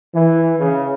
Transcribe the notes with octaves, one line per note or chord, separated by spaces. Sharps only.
E3
C#3